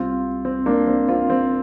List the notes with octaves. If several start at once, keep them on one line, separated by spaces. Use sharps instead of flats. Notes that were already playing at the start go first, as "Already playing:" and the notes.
Already playing: C2 C3 C4 F4
C4
A#3 D4
C4
C4 F4
C4